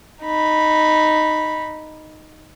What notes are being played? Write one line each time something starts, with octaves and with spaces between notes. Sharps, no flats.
D#4 B5